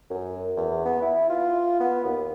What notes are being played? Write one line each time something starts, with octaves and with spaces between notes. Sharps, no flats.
F#2
E2
B3
E4
F4
B3
D#2